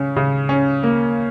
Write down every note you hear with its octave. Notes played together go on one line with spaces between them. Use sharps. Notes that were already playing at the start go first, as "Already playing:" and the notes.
Already playing: C#3 C#4
C#3
C#4
A#3